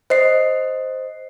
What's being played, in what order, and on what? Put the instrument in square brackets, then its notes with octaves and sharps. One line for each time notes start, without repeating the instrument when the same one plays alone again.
[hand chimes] C5 D#5 C7